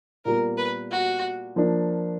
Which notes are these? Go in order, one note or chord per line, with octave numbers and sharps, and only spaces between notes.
A#2 G3 B3 A#4
B4
F#4
F3 A#3 D4